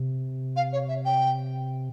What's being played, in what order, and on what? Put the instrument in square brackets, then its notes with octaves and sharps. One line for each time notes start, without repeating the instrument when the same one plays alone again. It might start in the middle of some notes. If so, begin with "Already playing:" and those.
Already playing: [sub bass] C3
[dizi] F5
C#5
E5
G5